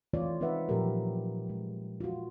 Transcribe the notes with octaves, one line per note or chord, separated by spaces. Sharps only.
E3 A3 C4 F4 C#5 D5
G#3 C4 D#4 B4 E5 F#5
A#2 F3 F#3 G4 A#4
G#3
F4 F#4